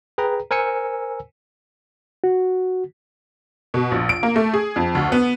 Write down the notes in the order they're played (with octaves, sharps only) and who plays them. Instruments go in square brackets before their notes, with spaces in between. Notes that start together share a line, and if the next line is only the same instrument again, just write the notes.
[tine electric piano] G#4 B4 G5 A#5
A#4 C5 G#5 E6 C#7
[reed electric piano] F#4
[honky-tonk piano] B2
A#1
D7
A#3
A3
G#4
F2
D2
B3